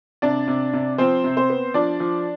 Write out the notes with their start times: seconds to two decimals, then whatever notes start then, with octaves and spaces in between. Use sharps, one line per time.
0.22 C3 D4 D5
0.48 C3
0.73 C3
0.98 F3 C4 C5
1.24 C3
1.37 C4 C5
1.50 B3
1.74 F3 D4 D5
2.00 F3